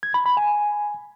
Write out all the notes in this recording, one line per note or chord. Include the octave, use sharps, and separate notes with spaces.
G#6
B5
B5
G#5